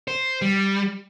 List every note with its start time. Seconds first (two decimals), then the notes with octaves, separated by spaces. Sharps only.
0.08 C5
0.42 G3